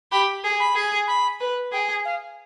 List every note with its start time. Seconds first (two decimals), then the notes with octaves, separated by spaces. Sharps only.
0.11 G4 B5
0.44 G#4 G#5
0.60 B5
0.76 G#4
1.07 B5
1.40 B4
1.72 G#4 G5
1.89 G#5
2.05 F5